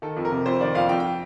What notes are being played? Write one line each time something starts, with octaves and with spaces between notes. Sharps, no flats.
D#3 A4
F2
A#4
C3
F2 C5
D#3 D5
F2 F5
F2 G5
G5